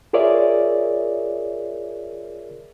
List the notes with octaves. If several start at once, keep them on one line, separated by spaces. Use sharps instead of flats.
F4 G#4 A#4 C#5 D5 E5